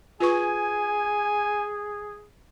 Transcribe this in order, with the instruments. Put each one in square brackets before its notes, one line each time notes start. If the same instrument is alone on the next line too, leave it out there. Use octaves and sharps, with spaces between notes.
[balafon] F4 B4 C#6 [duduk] G#4 [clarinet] G#5